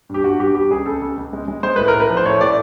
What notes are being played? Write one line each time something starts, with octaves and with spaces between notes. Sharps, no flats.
G2 G4
G2 F#4
G2 G4
G3 G4
C#2 G#4
C#2 A4
C#2
C#2
G#3
G#3
G#3 C5
A2 B4
A#4
A2
B4
F3
C5
A2 C#5
A2 D5